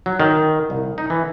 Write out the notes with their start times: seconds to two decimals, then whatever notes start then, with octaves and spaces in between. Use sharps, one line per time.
0.06 F#3
0.20 D#3
0.70 C2
0.98 D#4
1.10 E3